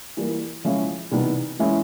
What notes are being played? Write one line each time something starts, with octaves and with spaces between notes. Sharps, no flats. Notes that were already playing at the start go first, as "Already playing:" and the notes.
E3 G3 A#3
C#3 F3 G#3 C#4 E4
C3 E3 G3 B3 D#4
E3 G#3 C#4 E4